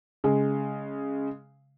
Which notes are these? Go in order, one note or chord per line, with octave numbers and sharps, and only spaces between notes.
C#3 G#3